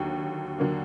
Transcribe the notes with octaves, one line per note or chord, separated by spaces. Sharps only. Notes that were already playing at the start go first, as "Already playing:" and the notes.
Already playing: D#2 D3 F#3
D3 F#3 A#3